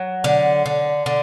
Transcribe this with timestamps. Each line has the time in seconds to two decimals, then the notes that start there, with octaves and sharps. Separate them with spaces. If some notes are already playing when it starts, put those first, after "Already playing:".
Already playing: F#3
0.24 D3
0.66 D3
1.06 D3